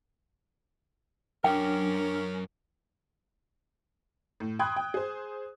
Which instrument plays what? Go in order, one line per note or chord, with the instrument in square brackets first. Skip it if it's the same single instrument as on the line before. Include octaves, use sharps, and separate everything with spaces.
[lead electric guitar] F#2 [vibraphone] F#3 D4 [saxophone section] C#4 A#4 [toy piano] G5
[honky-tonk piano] A2
G5 B5 C6 D#6 F#6 G#6
G5
G#4 C5